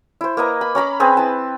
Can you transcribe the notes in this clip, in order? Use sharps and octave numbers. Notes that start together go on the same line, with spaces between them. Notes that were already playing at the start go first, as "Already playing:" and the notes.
E4 C5
A#3 B4 D#5 A#5
B5
C#4 A#5 B5 D6
C4 G#4 B4 G#5
E4 A5